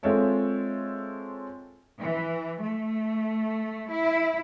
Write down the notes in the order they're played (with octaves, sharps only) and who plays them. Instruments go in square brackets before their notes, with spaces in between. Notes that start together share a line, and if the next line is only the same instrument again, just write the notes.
[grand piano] G#3 C4 F4 A4 C#5 E5
[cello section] E3
A3
E4